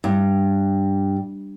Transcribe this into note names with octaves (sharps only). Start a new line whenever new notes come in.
G2